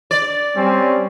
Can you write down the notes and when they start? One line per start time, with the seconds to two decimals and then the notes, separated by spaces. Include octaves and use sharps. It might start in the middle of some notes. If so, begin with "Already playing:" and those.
0.11 D5
0.55 G3 C4 C#4